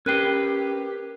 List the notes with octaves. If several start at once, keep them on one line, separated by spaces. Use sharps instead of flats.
C#4 G4 A#4 B4 G5 F#6 C7